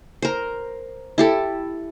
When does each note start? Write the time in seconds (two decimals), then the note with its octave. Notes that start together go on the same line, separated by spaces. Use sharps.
0.22 A#4 C5
1.18 E4 G4 A4